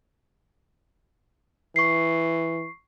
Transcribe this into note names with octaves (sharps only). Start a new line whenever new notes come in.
E3 C#6 C7